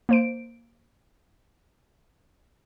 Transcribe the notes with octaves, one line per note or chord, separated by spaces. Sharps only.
A#3 C5 D7